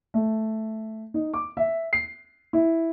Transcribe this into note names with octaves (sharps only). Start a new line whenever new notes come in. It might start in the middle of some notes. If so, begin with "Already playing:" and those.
A3
D#4
D6
E5
C7
E4